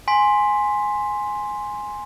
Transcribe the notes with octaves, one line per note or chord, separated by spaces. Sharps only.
G#5 C6 B6